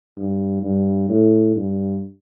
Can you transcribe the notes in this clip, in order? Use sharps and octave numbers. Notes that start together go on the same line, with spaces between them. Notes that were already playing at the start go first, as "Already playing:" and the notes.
G2
G2
A2
G2